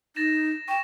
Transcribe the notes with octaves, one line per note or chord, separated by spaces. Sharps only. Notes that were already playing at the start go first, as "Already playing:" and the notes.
D#4 A6 A#6 E7
G5 C#6 E7